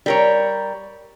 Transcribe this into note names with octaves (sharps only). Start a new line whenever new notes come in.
G3 A#4 C#5